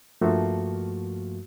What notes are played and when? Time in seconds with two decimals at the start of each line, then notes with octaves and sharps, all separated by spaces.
0.21 G2 F3 A3 A#3 F#4